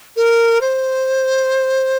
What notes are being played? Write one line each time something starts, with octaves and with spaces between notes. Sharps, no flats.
A#4
C5